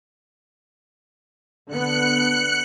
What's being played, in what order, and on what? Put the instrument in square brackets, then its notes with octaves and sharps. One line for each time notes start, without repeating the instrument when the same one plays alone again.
[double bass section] D3 B3 [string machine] F#6 C#7